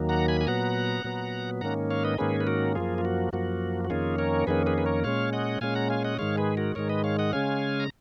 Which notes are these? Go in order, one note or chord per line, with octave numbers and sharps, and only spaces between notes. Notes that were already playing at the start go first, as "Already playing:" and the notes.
Already playing: D#2 D#3 F#3 A#3
F#5 A#5
G#5 B5
G#5
A#2 F#3 B3 F#5 A#5
A#2 F#3 B3
G#2 D#3 A#3 C#4 F#5 A#5
C#5 F5
B4 D#5
G#2 D#3 A#3 C#4 G#4 B4
B4
F#4 A#4
F#2 F3 A#3 F4 G#4
F4
F#4
F#2 F3 A#3 F#4
F#4
F2 D#3 A#3 C#4 F4 G#4
A#4 C#5
F2 D#3 A#3 C#4 G#4 B4
G#4 B4
B4
A#4 C#5
A#2 G#3 C#4 C#5 F5
D#5 F#5
A#2 G#3 C#4 F5 G#5
F#5 A#5
F5 G#5
D#5 F#5
G#2 D#3 G#3 C#5 F5
G#4 B4
F#4 A#4
G#2 D#3 G#3 A#4 C#5
B4 D#5
C#5 F5
D#5 F#5
C#3 G#3 C#4 F5 G#5
A#5